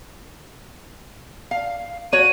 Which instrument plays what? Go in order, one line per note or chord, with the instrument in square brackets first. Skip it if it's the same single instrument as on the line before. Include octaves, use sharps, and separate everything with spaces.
[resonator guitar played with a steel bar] F5
[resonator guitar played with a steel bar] F#4 C#5 [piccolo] D#7